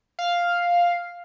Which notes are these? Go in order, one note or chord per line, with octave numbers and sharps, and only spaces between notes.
F5